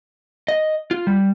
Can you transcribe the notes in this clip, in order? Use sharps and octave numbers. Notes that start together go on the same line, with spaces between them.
D#5
F4
G3